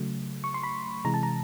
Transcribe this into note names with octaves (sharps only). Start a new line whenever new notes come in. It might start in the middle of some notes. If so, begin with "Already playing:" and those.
Already playing: C#3 F#3 A3
C#6
C6
B5
C3 E3 G#3 A#5
A5
A#5